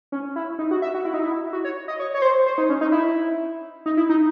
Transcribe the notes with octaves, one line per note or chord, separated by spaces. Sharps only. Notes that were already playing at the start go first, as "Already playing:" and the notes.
C#4
E4
D#4
F#4
E5
F#4
E4
D#4
E4
F#4
C#5
D#5
C#5
C#5
C5
C5
D#4
C#4
D#4
E4
D#4
E4
D#4